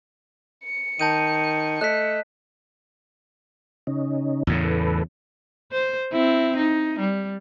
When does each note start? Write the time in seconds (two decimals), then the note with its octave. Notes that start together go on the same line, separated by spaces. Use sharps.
0.65 C#7
0.99 D#3 A5 G6 D#7
1.81 A3 D#5 F#6 B6
3.87 C#3 C#4 D#4
4.47 E2 A2 C#3
4.64 A4 B4
5.72 C5
6.12 C4 E4
6.57 D#4
6.99 G3